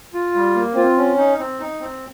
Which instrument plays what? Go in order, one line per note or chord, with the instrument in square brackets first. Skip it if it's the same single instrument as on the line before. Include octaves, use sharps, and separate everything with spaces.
[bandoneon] F4
G3
A#3
[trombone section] C4 [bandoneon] F4
[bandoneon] C#4
D#4
C4
D#4
C4